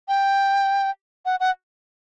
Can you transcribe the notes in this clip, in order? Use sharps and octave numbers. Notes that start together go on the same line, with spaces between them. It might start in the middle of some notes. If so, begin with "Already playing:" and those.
G5
F#5
F#5